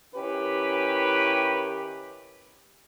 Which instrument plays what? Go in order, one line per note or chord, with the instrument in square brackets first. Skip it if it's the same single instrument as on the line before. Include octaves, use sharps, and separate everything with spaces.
[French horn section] D#3 C#4 E4 G4 B4